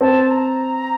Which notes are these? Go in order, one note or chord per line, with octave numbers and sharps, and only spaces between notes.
C4 A5
A#5